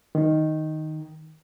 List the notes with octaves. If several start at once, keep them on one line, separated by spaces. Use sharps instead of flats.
D#3